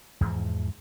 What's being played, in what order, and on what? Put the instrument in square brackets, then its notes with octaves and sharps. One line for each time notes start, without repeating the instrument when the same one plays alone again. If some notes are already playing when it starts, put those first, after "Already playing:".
[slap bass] E2 G#2 E3 F3